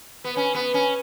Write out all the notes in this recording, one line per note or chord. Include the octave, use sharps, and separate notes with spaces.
B3
C#4
B3
C#4